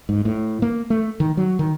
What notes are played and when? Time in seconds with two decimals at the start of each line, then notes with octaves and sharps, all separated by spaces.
0.09 G#2
0.25 A2
0.62 A#3
0.90 A3
1.20 D#3
1.37 F#3
1.59 D#3